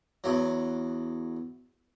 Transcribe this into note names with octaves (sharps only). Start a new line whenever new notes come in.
E2 F#3